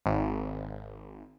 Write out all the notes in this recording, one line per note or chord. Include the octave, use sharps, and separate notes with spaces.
G#1